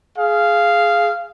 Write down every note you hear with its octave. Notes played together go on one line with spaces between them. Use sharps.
G#4 F5